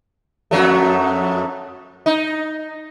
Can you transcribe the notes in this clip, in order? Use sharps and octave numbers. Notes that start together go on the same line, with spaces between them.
F2 F#3 A3
D#4